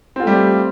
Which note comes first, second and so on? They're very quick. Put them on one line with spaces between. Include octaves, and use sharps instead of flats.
C4 F4 A3 G3